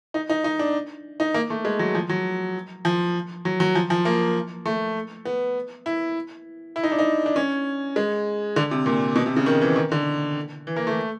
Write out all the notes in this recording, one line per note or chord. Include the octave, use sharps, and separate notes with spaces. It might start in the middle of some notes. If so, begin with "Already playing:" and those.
D#4
D#4
D#4
D4
D#4
A#3
A3
G#3
F#3
F3
F#3
F3
F#3
F#3
F3
F3
A#3
A3
B3
E4
E4
D#4
D4
D#4
D4
C#4
G#3
D3
C3
A#2
B2
C3
C#3
D#3
E3
D#3
D3
E3
A#3
A3